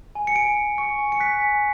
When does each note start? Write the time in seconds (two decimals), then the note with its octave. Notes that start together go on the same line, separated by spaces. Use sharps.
0.15 G#5
0.27 C#7
0.35 G#5 D7
0.57 G#5
0.78 C#6 C#7
0.98 G#5
1.12 C#7
1.20 F#6 B6
1.41 G#5